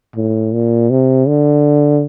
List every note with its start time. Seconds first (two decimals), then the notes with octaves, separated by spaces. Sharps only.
0.16 A2
0.53 A#2
0.90 C3
1.28 D3